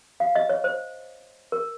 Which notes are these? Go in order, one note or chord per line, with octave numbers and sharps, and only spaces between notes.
F5
D#5
C#5
C5
A#4